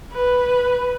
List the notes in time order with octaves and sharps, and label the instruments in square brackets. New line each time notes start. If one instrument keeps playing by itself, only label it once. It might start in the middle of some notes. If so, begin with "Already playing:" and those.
[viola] B4